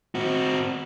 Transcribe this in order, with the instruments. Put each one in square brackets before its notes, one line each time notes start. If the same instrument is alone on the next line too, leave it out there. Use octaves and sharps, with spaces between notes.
[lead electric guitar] C4 F#4